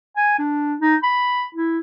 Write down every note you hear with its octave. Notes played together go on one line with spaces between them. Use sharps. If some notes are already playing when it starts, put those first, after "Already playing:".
G#5
D4
D#4
B5
E4